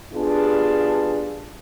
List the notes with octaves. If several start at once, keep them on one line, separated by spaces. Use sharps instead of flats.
G3 B3 D4 F4 G#4